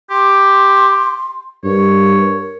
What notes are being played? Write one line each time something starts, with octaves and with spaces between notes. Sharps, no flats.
G4 C6
G2 A#4 C#5